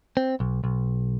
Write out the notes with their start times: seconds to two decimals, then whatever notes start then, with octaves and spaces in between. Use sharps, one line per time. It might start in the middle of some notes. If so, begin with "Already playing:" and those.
0.17 C4
0.40 B1
0.64 B1